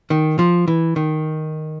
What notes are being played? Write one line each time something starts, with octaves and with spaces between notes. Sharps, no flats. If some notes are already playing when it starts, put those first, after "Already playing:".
D#3
F3
E3
D#3